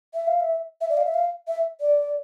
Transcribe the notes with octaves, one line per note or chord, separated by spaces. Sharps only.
E5
F5
E5
E5
D5
F5
E5
F5
E5
D5